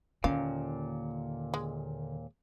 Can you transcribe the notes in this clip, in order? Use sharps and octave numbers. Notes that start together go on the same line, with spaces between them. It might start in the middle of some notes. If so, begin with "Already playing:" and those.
D#2 A#2 D3 C#4 F5
G#3